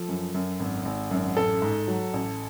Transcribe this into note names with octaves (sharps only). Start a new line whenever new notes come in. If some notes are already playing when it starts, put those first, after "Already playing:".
Already playing: F3 A4
F#2
F#2
G#1
G#1
F#2
A1 A4
G#2
F#3
A1